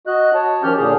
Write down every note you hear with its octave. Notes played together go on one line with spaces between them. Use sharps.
F#4 D#5 F#6
C#5 A5
D#3 F3 C#4 G4 F6 G6
A#2 D3 G#4